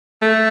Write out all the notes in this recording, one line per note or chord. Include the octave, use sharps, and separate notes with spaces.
A3